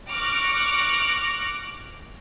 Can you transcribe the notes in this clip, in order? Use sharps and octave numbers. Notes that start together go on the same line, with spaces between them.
C#6 D6 F6 F#6 A#6 D7